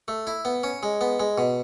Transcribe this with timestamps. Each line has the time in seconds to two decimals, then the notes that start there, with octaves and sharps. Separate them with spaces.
0.08 A3
0.27 E4
0.45 B3
0.63 C#4
0.83 G#3
1.01 B3
1.20 G#3
1.38 B2